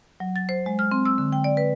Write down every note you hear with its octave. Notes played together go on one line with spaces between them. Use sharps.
F#3
A6
C5
G#3
F6
C4
E6
D3
G5
D5
B4